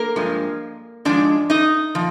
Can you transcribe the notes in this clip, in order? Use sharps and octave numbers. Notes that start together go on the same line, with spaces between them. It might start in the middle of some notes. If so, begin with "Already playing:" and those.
Already playing: A#3 A#4
G2 F3 G#3
G#2 F3 G#3 D4 D5
D#4 D#5
A#2 F3